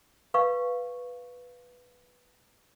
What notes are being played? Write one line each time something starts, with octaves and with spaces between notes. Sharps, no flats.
B4 F5 C#6